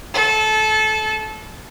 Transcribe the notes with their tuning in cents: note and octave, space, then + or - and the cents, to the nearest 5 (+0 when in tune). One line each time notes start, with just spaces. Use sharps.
A4 -25